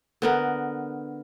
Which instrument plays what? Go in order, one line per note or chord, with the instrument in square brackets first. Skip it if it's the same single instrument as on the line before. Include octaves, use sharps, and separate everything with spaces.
[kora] D3 B3 A#4